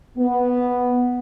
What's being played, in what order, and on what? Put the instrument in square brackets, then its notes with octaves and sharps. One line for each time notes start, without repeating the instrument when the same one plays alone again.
[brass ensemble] B3